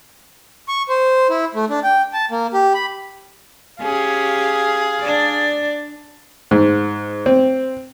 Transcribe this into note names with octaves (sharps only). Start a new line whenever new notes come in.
C#6
C5
E4
A3
D4
G5
A5
A#3
G4
B5
C#4 G4 G#4 F5
D4 D5
G#2
C4